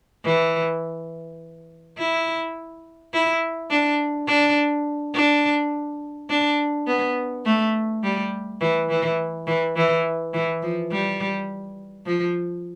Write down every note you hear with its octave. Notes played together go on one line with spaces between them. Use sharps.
E3
E4
E4
D4
D4
D4
D4
B3
A3
G3
E3
E3
E3
E3
E3
F3
G3
F3